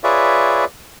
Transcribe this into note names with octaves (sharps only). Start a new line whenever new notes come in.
F4 G#4 B4 C#5 D5 E5